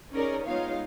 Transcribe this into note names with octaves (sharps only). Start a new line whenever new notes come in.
C#4 D#4 G#4 A#4 D5
G#3 B3 D#4 F4 C#5 F5